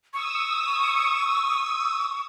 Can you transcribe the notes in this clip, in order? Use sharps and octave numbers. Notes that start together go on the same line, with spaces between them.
C#6 D#6 E6